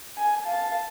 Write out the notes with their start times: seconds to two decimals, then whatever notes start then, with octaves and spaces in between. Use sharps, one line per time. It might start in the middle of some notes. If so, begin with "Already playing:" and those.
0.17 G#5
0.45 F5 A5